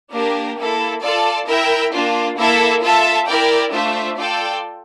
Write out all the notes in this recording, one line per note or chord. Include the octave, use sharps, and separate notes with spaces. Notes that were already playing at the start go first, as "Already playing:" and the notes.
A#3 D4 G4 A#4
A#3 E4 A4
F4 A4 D5 A5
E4 A#4 E5 G5
A#3 D4 F4
A#3 E4 A4 E5
F4 A4 E5 A5
E4 A#4 D5 G5
A3 D4 F4 C5 E5
F4 A4 D5 G5